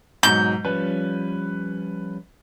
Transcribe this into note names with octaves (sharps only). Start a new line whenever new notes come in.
G#2 B2 F#3 G6
F3 G3 C#4 B4